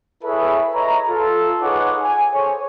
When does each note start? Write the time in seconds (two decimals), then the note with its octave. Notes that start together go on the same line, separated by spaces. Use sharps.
0.24 E4 G#4 A4 B4 C#5 E5
0.73 B4 C#5 D#5 E5 A#5
1.08 F4 A4
1.61 D#4 G#4 B4 C#5 F#5 D6
2.01 G#5
2.34 G#4 A4 C5 C#5